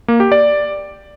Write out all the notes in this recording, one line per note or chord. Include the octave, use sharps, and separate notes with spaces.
A#3
G4
D5